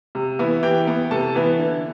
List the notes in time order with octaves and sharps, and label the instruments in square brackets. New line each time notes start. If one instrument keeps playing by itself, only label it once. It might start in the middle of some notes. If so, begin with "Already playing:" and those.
[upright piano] C3
E3 B3 E4
E3 G4 G5
B3 E4
C3 A4 A5
E3 B3 E4
D3